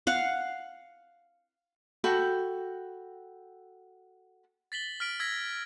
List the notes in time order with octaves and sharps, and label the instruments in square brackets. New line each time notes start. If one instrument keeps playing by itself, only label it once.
[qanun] F5 F#5
[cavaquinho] F#4 A4 G5 B5
[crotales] A6 B6 F#7 G7
F6 B6 D7 F#7
E6 G#6 A#6 B6